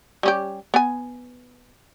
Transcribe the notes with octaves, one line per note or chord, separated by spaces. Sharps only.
G3 C#4 G4
B3 G#5